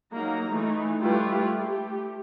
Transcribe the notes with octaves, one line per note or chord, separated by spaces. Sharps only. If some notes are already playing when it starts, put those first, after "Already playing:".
F#3 A#3 D#4 A#5
E3 A3 D#4
G3 A3 E4 F4 G4 B4
A3 G4